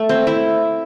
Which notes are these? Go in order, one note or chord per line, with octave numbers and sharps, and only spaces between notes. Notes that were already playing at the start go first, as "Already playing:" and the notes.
Already playing: A3
C4
E4